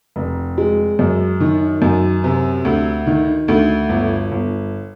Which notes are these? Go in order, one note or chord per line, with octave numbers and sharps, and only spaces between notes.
F1
G#3
F#2
D#3
F#2
C3
D2
D#3
D2
G1
G1